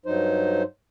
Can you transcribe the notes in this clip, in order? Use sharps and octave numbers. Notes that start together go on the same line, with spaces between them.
G2 F#3 D#4 C5